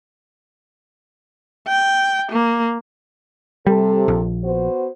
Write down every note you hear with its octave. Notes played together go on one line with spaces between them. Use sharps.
G5
A#3
C3 G3 A4
A#1
B3 F#4 C5